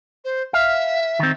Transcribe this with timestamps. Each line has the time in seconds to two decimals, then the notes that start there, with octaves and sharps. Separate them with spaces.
0.24 C5
0.53 E5 F5
1.19 D#3 C4